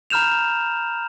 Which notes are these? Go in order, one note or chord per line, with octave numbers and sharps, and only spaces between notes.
A#5 B5 F6 G6 E7 F7